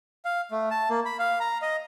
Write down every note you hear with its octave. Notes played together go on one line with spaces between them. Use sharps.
F5
A3
A5
A#3
B5
F5
A#5
D#5